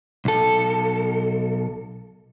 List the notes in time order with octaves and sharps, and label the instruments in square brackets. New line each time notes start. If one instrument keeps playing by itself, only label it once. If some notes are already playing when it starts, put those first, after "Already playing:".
[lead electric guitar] B1 A4